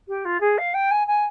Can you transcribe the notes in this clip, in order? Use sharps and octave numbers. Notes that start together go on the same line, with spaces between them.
G4
F4
G#4
F5
G5
G#5
G#5